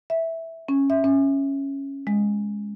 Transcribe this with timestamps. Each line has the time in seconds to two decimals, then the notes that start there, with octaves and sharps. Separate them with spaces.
0.10 E5
0.68 C#4
0.90 E5
1.04 C#4
2.07 G#3